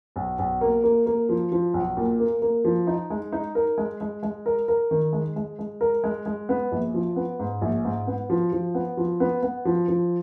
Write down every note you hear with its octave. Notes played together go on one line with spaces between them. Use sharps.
B1
B1
A#3
A#3
A#3
F3
F3
B1
A#2
A#3
A#3
F3
D#4
G#3
D#4
A#4
G#3
G#3
G#3
A#4
A#4
D#3
G#3
G#3
G#3
A#4
G#3
G#3
B3
A#1
F3
B3
G#2
A#1
G#2
B3
F3
F3
B3
F3
B3
B3
F3
F3